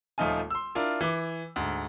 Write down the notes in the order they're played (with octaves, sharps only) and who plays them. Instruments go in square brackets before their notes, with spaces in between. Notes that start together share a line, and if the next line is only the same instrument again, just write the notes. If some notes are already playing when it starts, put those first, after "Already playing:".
[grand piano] D#1 F3 A3 D#4 F4 G#5
C6 E6
D4 E4 F4 A#4
E3 D6
D2 G#2